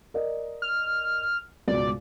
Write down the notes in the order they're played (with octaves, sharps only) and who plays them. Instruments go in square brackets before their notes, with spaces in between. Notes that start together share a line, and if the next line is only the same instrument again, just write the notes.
[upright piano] A#4 D5 D#5
[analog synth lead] F6
[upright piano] C#2 G#2 B2 [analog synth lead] D5